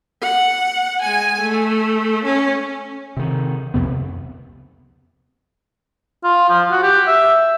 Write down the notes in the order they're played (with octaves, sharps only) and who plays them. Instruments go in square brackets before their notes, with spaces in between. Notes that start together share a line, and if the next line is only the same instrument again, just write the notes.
[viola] F#5
G#3 G#5
A3
C#4
[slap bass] C3 D#3
C2 F2 C3 B3
[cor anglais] F4
F3
F#4
G4
E5